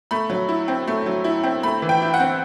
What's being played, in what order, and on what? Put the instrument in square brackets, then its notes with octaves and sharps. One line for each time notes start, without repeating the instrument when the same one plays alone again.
[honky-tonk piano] A3 B5
F#3
E4
C4
A3
F#3
E4
C4
A3 B5
E3
G5
E4
F#5
C4